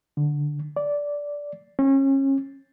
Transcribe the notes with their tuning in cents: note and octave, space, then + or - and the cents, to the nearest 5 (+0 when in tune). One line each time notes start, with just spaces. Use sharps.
D3 +0
D5 -10
C#4 -30